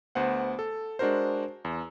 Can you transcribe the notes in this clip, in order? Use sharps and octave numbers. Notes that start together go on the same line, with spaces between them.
D2 B3 C5 F#5
A4
G#3 D4 F#4 A#4 C5
E2